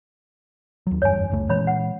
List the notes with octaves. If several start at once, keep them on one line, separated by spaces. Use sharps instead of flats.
D#2 F#3
F#1 E2 G2 C#5 G#5
F#1 C#2 A3
A#2 E3 G#3 C#4 C#5 B5
F#5